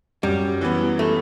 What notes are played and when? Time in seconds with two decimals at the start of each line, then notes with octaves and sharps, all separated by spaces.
0.23 F#2 G3
0.61 E3 B3
0.99 A3